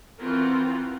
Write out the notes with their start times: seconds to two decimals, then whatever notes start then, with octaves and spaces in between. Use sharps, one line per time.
0.20 E3 C4 F4 F#4 A#4